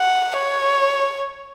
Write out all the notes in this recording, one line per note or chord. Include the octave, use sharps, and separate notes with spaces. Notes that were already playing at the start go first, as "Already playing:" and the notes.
Already playing: F#5
C#5